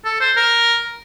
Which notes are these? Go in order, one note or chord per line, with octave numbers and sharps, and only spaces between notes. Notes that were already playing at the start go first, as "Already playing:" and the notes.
A4
C5
A#4